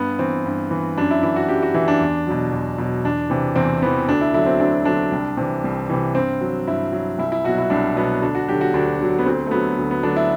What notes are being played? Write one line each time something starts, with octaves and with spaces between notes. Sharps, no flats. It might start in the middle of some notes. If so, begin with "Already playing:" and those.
Already playing: G2 B3
E3 C4
G2
E3
F#2 D4
E4
E3 E4
F#4
F#2 G4
F#4
E3 E4
D4
E2
B2 F#3
E2
B2 F#3
E2 D4
C3 E3
E2 C4
C3 E3 B3
D2 D4
E4
D3 F#3 E4
C4
D2 D4
D3 F#3 D4
C2
C3 E3
C2
C3 E3
G2 C4
F#3
G2 E4
F#3
C2 E4
E4
B2 F#3 F#4
E4
C2 D4
B2 F#3 B3
D2 D4
F#4
D3 F#3 G4
F#4
D2 D4
D3 F#3
B3
D2 C4
A3
D3 F#3 B3
D2
B3
D3 F#3 D4
E4